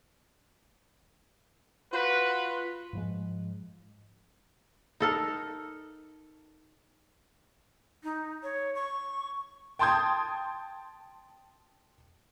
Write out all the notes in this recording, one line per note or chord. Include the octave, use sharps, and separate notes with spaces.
F4 F#4 B4
G#2 F3 G#3
D#4 A4 A#4
D#4
C#5
C#6
G5 A5 C6 D#6 G6 G#6